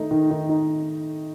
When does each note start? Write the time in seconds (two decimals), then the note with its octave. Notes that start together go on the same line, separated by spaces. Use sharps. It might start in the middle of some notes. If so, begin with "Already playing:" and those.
Already playing: D#3 A3 D#4
0.11 D#3
0.30 D#3
0.49 D#4